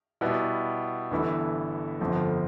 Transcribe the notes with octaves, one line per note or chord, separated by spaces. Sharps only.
B2 G3 B3 E4
G1 G2 E3 A3 E4
G1 F2 D3 F3 A3